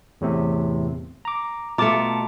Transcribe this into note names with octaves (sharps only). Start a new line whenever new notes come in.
E2 A2 C3
A#5 D6
B2 A3 F4 A5 A#5 D6 C#7